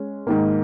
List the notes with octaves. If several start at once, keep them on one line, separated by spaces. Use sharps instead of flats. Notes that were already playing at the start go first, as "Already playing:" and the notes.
Already playing: G#3 C#4
G#2 D#3 A#3